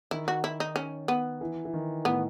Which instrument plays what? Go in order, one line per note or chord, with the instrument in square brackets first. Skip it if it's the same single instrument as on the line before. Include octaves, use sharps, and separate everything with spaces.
[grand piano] D#3 [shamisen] E4
[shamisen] F#4
E4
D#4
C#4
B3
[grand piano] E3
E3
D#3
[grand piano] A2 [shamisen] B3